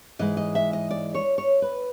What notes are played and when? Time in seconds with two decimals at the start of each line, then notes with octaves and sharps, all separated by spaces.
0.19 G#2 E3 G#3 D#5
0.37 D#5
0.55 E5
0.73 D#5
0.91 D5
1.14 C#5
1.38 C#5
1.62 B4